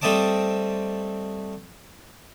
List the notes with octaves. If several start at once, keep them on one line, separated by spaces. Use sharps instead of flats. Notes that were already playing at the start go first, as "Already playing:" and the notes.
G3 A3 C4 D#5 A5 D6